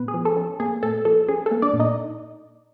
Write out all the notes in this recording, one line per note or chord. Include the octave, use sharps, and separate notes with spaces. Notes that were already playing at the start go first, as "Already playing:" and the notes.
Already playing: A#2 B3 B4
G#4
F3
A4
C#4
A#3 G#4
A#2 A4
F3 A4
C#4 G#4
A4
A#3
D4 D5
A#2
D#4 D#5